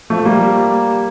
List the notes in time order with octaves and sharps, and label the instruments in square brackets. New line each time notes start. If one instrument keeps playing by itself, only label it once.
[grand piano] F3 A3
G3 A#3